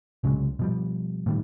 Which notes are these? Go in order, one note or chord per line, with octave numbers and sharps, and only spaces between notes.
C2 C#3 F#3 G#3
B2 F3 G3
A2 D#3 G3